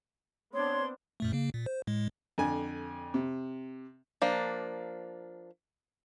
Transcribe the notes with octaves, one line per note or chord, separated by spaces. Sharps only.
B3 C4 D4 C#5 C6
F#2 A#2 A3
C#3 A#3
A#2
C5
A2 G#3
F2 D3 G#5
C3
F3 A#3 D4